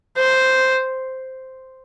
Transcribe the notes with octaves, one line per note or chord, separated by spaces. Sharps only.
C5